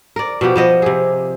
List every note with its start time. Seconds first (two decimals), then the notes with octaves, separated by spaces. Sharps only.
0.16 A#4 D5
0.41 B2 F3 B3 G4
0.56 F3 B3 D#5
0.82 C3 G#4